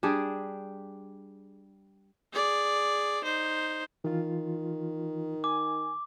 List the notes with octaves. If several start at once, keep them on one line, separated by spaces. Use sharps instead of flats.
G3 D4 G#4
G#4 D5
D#4 C5
D#3 E3 F4
G#5 D6